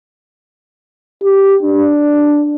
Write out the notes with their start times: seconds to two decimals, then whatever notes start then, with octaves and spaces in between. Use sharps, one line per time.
1.24 G4
1.62 D4